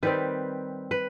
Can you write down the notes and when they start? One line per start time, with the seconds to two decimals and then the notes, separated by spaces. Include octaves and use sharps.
0.03 D#3 G3 C4 B4
0.91 B4